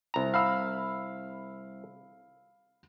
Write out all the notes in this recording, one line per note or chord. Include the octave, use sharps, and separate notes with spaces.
C2 A#5
F5 B5 E6